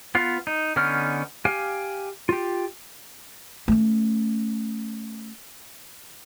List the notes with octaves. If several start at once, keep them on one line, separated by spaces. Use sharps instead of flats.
B3 F4 F5
D#4
D3 B3 C#4 D#4 F6
G4 F5 G#5
F4 G4
A3 C#4